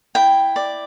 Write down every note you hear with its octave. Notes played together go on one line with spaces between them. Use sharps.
E4 G5
D5